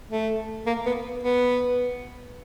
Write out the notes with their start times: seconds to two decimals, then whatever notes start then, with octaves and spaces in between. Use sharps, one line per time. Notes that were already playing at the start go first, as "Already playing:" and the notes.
0.10 A3
0.67 A#3
0.86 B3
1.24 B3